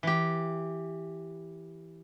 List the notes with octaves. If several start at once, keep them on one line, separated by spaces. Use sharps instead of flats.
E3 G4